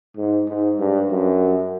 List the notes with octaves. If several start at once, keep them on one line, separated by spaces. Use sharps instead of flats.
G#2
G#2
G2
F#2